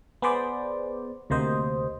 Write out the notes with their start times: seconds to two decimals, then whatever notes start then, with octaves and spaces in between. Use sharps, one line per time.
0.22 B3 G#4 B4 C5 D5
1.30 D2 C3 A#3 C5 D#5